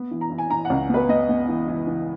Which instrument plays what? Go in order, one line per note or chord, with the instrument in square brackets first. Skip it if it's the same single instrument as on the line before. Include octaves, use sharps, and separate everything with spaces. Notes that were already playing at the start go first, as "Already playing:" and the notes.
Already playing: [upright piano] B3
E3
A#5
E3
G#5
E3 A#5
F#5
C#2
B3 B4
B3 D#5
B3
E3
E3
E3